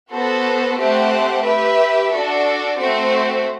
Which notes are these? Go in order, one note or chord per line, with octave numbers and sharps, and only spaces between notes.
B3 F#4 A4 C5
A3 C4 G4 C5 F#5
G4 B4 E5
D4 F#4 A4
A3 C4 F#4 C5